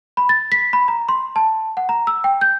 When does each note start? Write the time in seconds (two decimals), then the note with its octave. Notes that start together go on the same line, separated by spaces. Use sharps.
0.17 B5
0.29 A6
0.52 B6
0.73 B5
0.88 A#5
1.09 C6
1.36 A5
1.77 F#5
1.89 A#5
2.07 E6
2.24 G5
2.41 G6